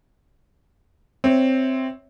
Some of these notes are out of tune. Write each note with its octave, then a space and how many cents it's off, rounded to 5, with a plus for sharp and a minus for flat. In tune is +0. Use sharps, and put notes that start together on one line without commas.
C4 +0 C#5 +0 E5 -10